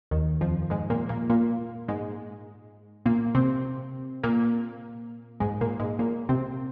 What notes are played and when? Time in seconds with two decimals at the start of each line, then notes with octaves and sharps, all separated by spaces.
0.11 D#2 D#3
0.41 F2 F3
0.70 G#2 G#3
0.90 A#2 A#3
1.09 A#2 A#3
1.30 A#2 A#3
1.88 G#2 G#3
3.06 A#2 A#3
3.35 C3 C4
4.23 A#2 A#3
5.40 G#2 G#3
5.61 A#2 A#3
5.80 G#2 G#3
5.99 A#2 A#3
6.29 C3 C4